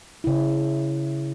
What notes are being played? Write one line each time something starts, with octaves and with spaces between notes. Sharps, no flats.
C#3 E4